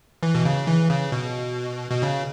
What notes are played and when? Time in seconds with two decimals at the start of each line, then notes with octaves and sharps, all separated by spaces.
0.23 E3
0.35 B2
0.45 C#3
0.67 E3
0.90 C#3
1.12 B2
1.91 B2
2.02 C#3